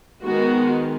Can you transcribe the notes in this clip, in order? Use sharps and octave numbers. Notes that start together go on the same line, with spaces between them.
D#3 G#3 B3 F#4